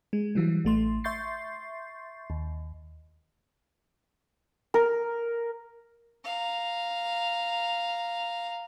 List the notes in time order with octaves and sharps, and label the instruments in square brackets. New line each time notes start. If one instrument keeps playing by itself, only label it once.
[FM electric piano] G#3
E3 F#3 G3
A1 A3 C6
E5 C6 C#6 G6 A6 C7
D#2
[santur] A#4
[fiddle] F5 A#5